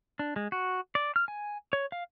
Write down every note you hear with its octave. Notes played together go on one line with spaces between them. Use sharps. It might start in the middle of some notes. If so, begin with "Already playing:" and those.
D4
G#3
F#4
D5
F6
G#5
C#5
F5